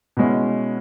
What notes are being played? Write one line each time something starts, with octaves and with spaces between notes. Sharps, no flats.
B2 G#3 C#4 E4